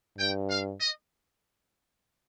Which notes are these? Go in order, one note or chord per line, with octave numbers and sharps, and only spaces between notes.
G2 G5
F5
D#5